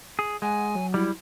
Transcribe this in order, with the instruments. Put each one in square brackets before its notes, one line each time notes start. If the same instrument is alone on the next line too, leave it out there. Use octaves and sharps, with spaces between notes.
[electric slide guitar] G#4
[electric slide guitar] G#3 [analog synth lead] F#5 [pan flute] G#5
[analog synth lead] F#3
[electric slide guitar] G3 [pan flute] E4